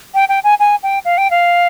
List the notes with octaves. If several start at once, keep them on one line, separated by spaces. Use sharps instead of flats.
G5
G5
G#5
G#5
G5
F5
G5
F5